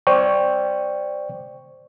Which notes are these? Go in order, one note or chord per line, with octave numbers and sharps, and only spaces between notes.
C5 D5 G5 C#6